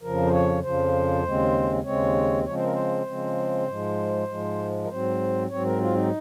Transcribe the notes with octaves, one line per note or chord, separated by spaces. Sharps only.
F2 C#3 F3 A#4
C5
C#5
F2 C#3 F3 C5
D#2 C#3 G#3 C4
D#2 C#3 G#3 C4 C#5
C#3 F3 G#3 C4 C#5
C5
A#4
C5
C#3 F3 G#3 C4
G#2 F3 G#3
G#2 F3 G#3
A#4
G#2 F#3 C4 C5
G#2 F#3 C4 C#5
A#4
F4
D#4